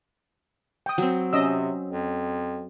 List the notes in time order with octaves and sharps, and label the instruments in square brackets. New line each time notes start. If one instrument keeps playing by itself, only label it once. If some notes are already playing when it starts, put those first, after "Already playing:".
[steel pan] G5 D#6
[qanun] F#3 C4
[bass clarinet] C3 [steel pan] C#4 D#5 E6
[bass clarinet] F2